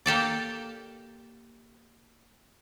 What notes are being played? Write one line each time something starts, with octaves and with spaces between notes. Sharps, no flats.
A#3 G4 A4 D5